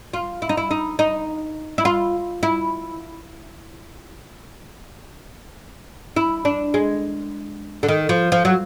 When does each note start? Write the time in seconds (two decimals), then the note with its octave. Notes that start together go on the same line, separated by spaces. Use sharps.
0.13 F4
0.42 E4
0.49 D#4
0.57 E4
0.71 D#4
0.99 D#4
1.78 E4
1.85 F4
2.43 E4
6.16 E4
6.45 D4
6.74 G#3
7.83 D3
7.88 D#3
8.09 F3
8.32 F3
8.45 F#3